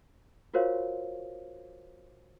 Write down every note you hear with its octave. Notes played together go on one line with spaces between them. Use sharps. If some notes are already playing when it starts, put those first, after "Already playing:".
F4 F#4 A#4 C5 C#5 F5